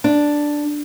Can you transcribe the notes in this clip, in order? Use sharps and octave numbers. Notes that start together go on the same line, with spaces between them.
D4